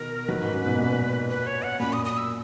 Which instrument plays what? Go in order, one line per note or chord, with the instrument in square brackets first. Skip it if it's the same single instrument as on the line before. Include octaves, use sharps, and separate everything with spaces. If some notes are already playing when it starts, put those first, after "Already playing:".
Already playing: [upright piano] B2 D#3 [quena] A#4
[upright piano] D#3 F#3 [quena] B4
[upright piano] G#2
F#2
G#2 B2
F#2 A#2
[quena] B4
C#5
F#5
[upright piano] F#2 A#2 [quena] B5
[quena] D#6
D#6
E6